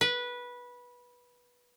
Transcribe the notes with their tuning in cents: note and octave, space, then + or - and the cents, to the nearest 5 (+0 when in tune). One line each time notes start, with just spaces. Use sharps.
B4 -15